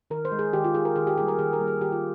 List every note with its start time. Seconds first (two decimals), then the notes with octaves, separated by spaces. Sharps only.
0.10 D#3 A#4
0.25 C5
0.32 G#3
0.39 G#4
0.53 D#3 G4
0.64 F4
0.74 G#3 G#4
0.85 A#4
0.96 D#3 G#4
1.07 G4
1.18 A#3 G#4
1.21 G3
1.28 A#4
1.39 D#3 G#4
1.53 A#4
1.60 G3 A#3
1.67 G#4
1.81 D#3 G4
1.92 F4